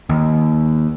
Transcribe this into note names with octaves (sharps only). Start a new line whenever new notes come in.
D#2